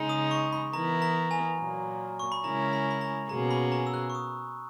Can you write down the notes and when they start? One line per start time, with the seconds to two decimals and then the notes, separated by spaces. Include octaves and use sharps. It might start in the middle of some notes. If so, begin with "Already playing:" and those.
Already playing: C#3 G#3 D#4
0.09 D#6
0.31 C#6
0.53 B5
0.73 E3 B3 E4 A#4 A#5
1.02 A#5
1.31 G#5
1.59 A#2 F#3 A#3
2.19 C#6
2.32 B5
2.44 C#3 G#3 C#4 E4 A#4 A#5
2.73 B5
2.91 B5
3.01 A#5
3.29 B2 A#3 C#4 G#4 A#5
3.51 B5
3.72 A#5
3.87 E6
3.94 F#6
4.10 C#6
4.15 D#6